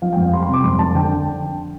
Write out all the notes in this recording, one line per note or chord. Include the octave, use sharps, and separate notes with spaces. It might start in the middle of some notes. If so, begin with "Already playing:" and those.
F3 F5
F2 G5
F5
G3 C6
C6
C3
D6
F2 C6
F2 A5
D3 G5